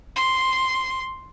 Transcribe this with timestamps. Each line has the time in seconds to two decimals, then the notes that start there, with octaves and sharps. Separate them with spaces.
0.16 C6